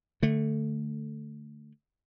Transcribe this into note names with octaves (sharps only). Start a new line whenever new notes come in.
D3 A3